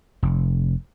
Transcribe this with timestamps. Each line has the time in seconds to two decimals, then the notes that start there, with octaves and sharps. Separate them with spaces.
0.23 F1